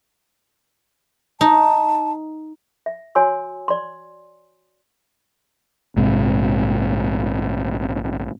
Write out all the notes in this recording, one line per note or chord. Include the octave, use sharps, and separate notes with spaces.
D#4 A5
E5
F#4 C#5 G#5 C6 E6
D5 C6
A#1 G#2 C3